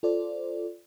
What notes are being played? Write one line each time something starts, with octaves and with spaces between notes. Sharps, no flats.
F4 A4 C5 D5